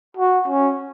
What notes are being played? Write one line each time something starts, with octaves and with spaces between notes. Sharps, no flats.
F#4
C#4